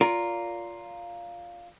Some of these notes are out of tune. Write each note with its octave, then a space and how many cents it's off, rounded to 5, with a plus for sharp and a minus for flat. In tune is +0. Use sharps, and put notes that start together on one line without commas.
F4 +0 A#4 +0 D5 -30